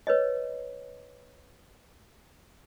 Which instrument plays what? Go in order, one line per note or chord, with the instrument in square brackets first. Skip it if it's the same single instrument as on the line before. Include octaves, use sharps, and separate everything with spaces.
[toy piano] B4 C#5 D#5